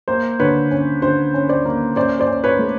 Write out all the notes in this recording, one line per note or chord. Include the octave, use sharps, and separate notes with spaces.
A#3 C5
D3 B4 C#5
C#4
D3 C5
C#4
C5 D5
A#3
C#4 C5 D5
C5 D5
C#4
B4 C#5
A3